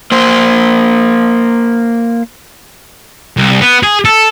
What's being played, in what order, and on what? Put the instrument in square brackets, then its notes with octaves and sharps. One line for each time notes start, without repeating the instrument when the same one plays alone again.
[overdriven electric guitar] A#3 C5
[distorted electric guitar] C2
B3
G#4
A4